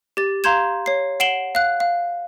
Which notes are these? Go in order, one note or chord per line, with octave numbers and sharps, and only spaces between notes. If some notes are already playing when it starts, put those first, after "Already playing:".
G4 A6
F5 A#5 C6 G6 G#6 E7
C#5 C7
F#5 C7 D7 E7 F#7 G7
F5 F#6
F5